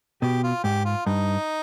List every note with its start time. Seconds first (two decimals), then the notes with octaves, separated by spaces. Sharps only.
0.22 B2 G4
0.43 F4
0.64 G#2 G4
0.85 F4
1.06 G2 D#4